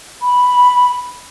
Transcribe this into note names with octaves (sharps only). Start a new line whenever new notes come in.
B5